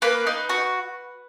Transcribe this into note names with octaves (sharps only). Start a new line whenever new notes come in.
A#3 B4
D#4
F#4